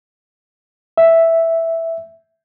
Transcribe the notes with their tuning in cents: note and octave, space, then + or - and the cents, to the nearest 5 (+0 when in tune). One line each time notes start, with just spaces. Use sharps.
E5 +0